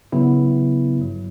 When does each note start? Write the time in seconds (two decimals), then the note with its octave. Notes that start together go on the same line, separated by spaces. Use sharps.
0.12 C#3 F#3 B3 E4
0.98 G1 G2 F#3